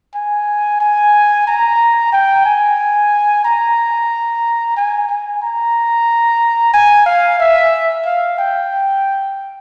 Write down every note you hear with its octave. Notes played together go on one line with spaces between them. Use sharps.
G#5
G#5
A#5
G5
G#5
A#5
G#5
G#5
A#5
G#5
F5
E5
F5
G5